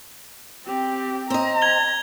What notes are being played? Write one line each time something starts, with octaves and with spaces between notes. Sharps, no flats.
C4 G4
C4 D#5 A#5
G#6 F7 G7